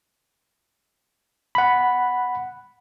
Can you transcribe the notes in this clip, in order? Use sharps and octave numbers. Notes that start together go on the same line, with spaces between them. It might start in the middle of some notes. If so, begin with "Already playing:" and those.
F#5 B5